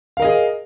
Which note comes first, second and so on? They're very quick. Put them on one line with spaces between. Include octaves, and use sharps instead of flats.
F5 A#4 D#5 G#4